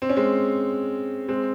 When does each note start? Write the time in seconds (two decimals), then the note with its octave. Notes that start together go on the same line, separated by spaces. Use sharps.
0.02 C4
0.10 C#4
0.17 G#3 C4
1.28 G#3 C4